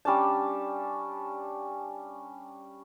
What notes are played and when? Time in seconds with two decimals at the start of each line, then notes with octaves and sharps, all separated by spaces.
0.05 G3 C#4 D4 A5